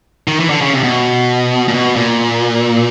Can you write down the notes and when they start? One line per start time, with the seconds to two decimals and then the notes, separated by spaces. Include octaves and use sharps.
0.28 D#3
0.40 E3
0.50 D3
0.61 C#3
0.73 C3
0.83 B2
1.68 A#2
1.74 B2
1.96 A#2